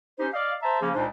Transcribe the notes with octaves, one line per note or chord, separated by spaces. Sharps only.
C#4 D#4 G4 C5
D5 D#5 F5
C5 E5 A5 A#5
C#3 F3 A#3 C#4 G#4
C#2 A#2 D4 D#4 C5